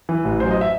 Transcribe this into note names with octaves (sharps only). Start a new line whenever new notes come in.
E3
A1
F#2 C5
D#5
E5